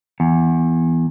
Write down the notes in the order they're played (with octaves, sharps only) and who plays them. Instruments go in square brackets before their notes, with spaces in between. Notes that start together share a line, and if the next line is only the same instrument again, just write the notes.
[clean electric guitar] E2